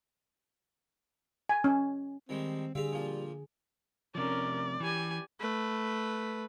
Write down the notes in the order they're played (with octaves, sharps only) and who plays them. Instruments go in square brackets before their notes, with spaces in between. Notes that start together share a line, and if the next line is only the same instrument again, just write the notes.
[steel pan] G#5
C#4
[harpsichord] D#3 G3 G#3 [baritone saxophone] C4
[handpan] D3 G#4 [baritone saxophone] G3 [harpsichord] C4 E5 F5
[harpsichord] A#2 F3 F4
[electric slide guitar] C3 F3 [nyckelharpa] C#4 A#4 [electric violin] D5
[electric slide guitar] E3 [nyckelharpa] G4 G#5
[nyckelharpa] A3 B4